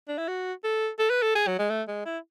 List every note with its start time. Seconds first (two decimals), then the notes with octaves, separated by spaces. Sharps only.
0.08 D4
0.18 E4
0.28 F#4
0.64 A4
0.99 A4
1.10 B4
1.22 A4
1.35 G#4
1.47 F#3
1.59 G#3
1.70 A3
1.88 G#3
2.05 E4